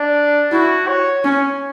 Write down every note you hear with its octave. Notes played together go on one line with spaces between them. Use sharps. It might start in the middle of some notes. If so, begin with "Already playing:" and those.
Already playing: D4
E4 F#4
C#5
C#4